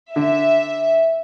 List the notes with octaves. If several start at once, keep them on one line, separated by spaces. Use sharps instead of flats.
D3 E5